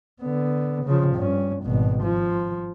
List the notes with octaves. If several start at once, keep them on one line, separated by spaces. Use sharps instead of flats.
D3 B3
C#3 F3
G2 C#4
G#1 B2
F3